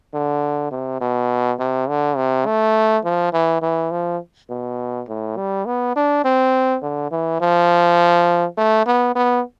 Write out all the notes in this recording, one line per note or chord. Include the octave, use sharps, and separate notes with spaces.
D3
C3
B2
C3
D3
C3
A3
F3
E3
E3
F3
B2
A2
G3
B3
D4
C4
D3
E3
F3
A3
B3
B3